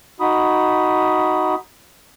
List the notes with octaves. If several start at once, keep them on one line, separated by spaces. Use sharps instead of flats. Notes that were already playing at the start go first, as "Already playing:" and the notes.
D#4 F#4 B5 D#6